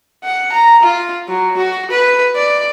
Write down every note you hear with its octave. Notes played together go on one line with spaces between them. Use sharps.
F#5
A#5
F4
F#3
F#4
B4
D5